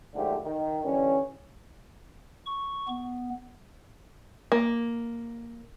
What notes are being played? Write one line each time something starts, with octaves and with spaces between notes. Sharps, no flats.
A#1 G#2 D3 A3 G4
D#3
D3 E3 G3 C#4
C#6
B3
A#3